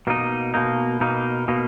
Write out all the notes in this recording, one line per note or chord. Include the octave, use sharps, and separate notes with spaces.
B2 A#3 D#4
B2 A#3 D#4
B2 A#3 D#4
B2 A#3 D#4